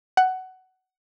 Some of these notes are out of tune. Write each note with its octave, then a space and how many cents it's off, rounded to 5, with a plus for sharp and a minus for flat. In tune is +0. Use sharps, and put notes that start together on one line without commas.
F#5 +15